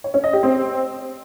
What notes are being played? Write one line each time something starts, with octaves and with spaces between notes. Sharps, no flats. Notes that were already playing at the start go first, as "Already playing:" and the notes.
C#5
C#4
D#5
G4
C4